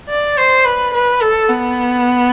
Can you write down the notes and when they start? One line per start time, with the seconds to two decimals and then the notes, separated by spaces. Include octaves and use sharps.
0.09 D5
0.37 C5
0.65 B4
0.94 B4
1.22 A4
1.49 B3